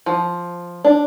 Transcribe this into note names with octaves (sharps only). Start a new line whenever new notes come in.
F3
D4